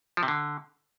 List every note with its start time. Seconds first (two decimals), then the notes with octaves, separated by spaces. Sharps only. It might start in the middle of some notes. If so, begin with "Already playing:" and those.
0.17 F3
0.23 C3
0.28 D3